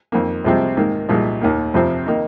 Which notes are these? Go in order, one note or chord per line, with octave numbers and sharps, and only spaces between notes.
F2 D#3 A#3
C2 C3 F3 G#3 C4
G#2 D#3 A#3
C2 A#2 F3 G#3 D#4
D#2 D#3 A#3
F2 C3 F3 C4
D#3 A#3 D#4